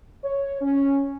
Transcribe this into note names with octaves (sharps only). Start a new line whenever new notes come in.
C#5
C#4